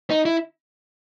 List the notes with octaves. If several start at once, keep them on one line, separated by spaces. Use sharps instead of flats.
D#4
E4